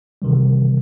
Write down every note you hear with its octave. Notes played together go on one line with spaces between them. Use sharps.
C3 D#3 E3 G3